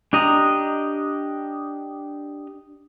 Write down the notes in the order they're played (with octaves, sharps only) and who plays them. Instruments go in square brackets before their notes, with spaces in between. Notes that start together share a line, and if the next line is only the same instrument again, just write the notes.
[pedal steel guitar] D4 G4 D#5 A#5